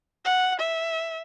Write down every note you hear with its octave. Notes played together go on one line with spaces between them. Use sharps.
F#5
E5